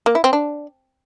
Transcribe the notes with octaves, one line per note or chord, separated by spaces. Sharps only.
A#3
E4
C4
D4